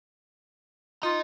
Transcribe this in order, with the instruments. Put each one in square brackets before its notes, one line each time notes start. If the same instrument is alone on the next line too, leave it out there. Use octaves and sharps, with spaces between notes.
[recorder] F4 [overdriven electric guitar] D#5 A#5